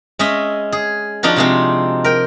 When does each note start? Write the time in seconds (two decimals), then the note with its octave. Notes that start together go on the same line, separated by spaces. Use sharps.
0.19 G#3 C#4 D#5 E5
0.72 G#4
1.23 F3 D4 D#4 F4 F#4
1.36 C3 G#3 C4
2.04 A#4 G5